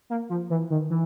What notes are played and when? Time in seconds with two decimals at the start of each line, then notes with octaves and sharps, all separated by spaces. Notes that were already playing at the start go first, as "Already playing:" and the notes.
0.10 A#3
0.30 F3
0.50 E3
0.70 D#3
0.90 E3